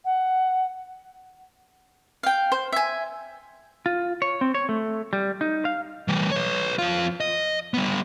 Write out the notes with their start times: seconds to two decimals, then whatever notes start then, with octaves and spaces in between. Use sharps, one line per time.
0.05 F#5
2.23 F5 G5
2.52 C5
2.72 E5 G#5
3.86 F4
4.22 C#5
4.41 C4
4.55 C#5
4.69 A3
5.13 G3
5.41 D#4
5.65 F5
6.08 E3 G3
6.31 B4 C#5
6.78 F2 F4
7.20 D#5
7.74 G3 B3